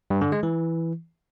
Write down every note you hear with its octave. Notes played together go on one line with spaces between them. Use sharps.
G2
D3
G#3
E3